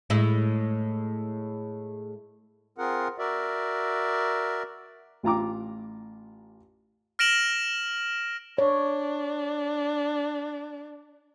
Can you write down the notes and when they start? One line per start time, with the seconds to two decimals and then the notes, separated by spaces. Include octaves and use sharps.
0.10 A2 G#3 E4
2.78 C4 F4 G#4 A#4 F#5
3.18 F#4 A#4 D5 E5
5.23 A1 F4 A#5 D6
7.19 F6 A#6 D7 E7 F#7
8.58 D4 C#5